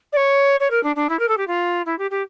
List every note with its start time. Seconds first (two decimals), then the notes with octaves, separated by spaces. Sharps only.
0.12 D5
0.16 C#5
0.60 C#5
0.70 A#4
0.83 D4
0.95 D4
1.09 E4
1.19 A#4
1.28 A4
1.37 G4
1.47 F4
1.85 E4
1.98 G4
2.10 G4